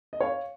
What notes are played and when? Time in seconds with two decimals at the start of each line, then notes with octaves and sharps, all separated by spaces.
0.13 D#5
0.20 C#5 F5